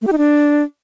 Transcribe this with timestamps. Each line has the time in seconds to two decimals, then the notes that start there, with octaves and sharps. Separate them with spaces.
0.02 A3
0.07 G4
0.12 D#4
0.18 D4